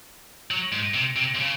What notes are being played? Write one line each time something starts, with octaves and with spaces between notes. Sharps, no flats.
F#3
G#2
C3
C3
C3
C#3